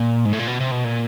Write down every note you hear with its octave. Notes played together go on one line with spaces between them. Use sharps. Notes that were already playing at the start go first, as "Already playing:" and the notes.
Already playing: A#2
G#2
A2
A#2
B2
C3
B2
A#2